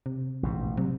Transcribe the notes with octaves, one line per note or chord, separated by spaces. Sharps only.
C3
A1 G#2 B2
C3 F#3 G3